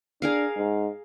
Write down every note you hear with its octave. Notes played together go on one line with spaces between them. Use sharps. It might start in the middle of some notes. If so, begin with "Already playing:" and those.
D4 G#4 A#4 F5
G#2